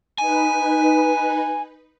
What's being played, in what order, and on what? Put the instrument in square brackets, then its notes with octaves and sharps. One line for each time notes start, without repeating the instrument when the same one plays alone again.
[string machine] D#4 B4 [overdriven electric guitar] G#5